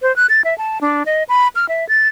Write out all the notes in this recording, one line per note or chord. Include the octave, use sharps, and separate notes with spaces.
C5
F#6
A6
E5
A5
D4
D#5
B5
F6
E5
A6